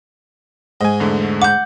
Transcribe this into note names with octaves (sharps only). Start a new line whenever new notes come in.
G#2 D#5 G#5
E2 D3 A3
F#5 D6 G6